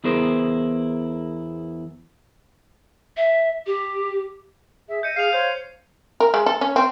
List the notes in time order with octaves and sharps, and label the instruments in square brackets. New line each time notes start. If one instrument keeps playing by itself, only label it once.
[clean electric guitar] E2 B3 E4 G#4 A#4 C5
[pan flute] E5
G4
[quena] G#4 [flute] E5
[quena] D#5 [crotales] G6 C#7 D#7
[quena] G#4 [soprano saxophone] F5 [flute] F6 [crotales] C7 F7
[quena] C5 [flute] C#5 [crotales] G6
[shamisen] A#4
G#3
A4
C#4
C4